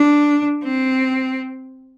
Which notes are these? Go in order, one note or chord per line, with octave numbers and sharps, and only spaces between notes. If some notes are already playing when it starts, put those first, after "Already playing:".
Already playing: D4
C4